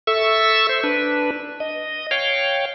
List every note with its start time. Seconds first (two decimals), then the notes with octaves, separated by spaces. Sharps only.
0.07 A4 E5 C#6 E6
0.69 C5
0.83 D4 B4
1.60 D#5
2.11 C#5 F5 G5